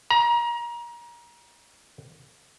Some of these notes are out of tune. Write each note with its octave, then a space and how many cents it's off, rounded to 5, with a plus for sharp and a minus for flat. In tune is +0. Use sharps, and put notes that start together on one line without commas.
A#5 +30